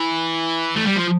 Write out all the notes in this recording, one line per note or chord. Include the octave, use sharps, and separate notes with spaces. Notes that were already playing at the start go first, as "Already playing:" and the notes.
Already playing: E3
A3
G3
F3